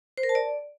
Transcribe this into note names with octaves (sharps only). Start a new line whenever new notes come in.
C5
A#4
A5
D5